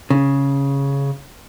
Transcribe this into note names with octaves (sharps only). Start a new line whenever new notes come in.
C#3